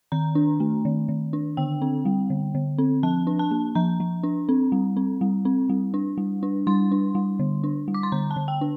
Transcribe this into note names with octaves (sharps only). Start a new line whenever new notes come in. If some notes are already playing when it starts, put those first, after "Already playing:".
D#3 A#5
D4
A3
D#3
D#3
D4
D3 G5
C4
G3
D3
D3
C4
F3 A5
D4
A5
A#3
F3 A#5
F3
D4
C4
G3
C4
G3
C4
G3
D4
G3
D4
G3 C6
D4
G3
D3
D4
G3
D6
C6
D3 A#5
A5
D3
G5
D4